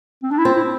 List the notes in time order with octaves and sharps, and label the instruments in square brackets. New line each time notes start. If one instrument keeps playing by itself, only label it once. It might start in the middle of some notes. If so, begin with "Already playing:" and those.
[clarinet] C4
D4
E4
[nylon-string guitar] C4 [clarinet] F4
[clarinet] E4